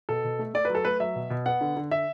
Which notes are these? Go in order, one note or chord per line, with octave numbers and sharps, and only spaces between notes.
B2 A4
B2
A3
A3 D5
F#3 B4
A4
A3 B4
F#3 E5
B2
B2
B3 F#5
D3
D3
D3 E5